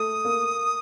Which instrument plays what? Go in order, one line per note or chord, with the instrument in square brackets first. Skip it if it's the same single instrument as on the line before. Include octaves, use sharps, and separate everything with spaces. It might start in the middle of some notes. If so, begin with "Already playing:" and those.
Already playing: [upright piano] A3 [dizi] D#6
[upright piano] A#3